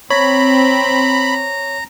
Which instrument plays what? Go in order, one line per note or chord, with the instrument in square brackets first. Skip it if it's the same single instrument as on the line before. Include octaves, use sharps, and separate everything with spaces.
[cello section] C4 [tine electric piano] C#5 [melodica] A#5 [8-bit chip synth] B5